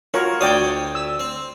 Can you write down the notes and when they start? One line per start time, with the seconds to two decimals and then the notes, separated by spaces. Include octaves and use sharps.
0.14 F4 F#4 A#4 C#5
0.41 D2 D4 C#5 D5 G5 D#6
0.95 E6
1.19 C4